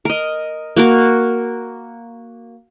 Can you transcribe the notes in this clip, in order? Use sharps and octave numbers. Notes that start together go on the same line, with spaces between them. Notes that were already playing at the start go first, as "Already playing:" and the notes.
A#4 D#5
A#3 F#4 A#4